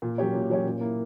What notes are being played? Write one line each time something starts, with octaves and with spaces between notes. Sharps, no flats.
A#2
F#3 C#4 G4 C#5
A#2
F#3 C#4 G4 C#5
A#2
A#3 E4